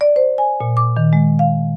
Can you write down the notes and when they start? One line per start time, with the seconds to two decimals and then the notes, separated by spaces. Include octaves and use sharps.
0.01 D5
0.16 C5
0.38 G#5
0.61 A#2
0.77 D6
0.97 D#3
1.13 G#3
1.39 F5